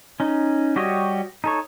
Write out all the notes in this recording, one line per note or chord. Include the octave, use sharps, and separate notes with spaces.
C#4 D#4
G3 F#4 G4 C#5 D#5
D#4 A4 C#5